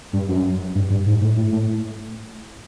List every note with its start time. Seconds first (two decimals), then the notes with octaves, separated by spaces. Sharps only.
0.13 G2
0.29 F#2
0.75 G2
0.90 G2
1.06 G#2
1.22 A2
1.37 A2
1.52 A2